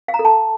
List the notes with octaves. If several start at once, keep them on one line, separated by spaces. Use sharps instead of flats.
F5
A#5
A4
A5